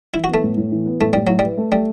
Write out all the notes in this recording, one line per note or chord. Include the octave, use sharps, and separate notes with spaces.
E3 E4
F#4
B3
A3
A2
A2
E3
B3
A2 A3
A2 G3
F#3 E4
G3
B4
A3
G3 A3